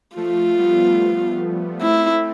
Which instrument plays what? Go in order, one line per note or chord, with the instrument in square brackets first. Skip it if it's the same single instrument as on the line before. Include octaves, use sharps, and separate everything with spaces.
[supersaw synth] F3 A3 [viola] F4
[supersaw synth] G3 B3
[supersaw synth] A3 C4 [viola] E4